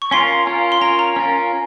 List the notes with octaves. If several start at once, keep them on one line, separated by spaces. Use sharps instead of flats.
C#6
C#4 F4 A#4 C6
C#4 F4 A#4
C6
C#4 F4 A#4 A#5
A#5
C#4 F4 A#4